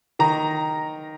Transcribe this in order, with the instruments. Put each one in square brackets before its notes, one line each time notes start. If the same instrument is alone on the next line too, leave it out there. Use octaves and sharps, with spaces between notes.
[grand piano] D#3 A#5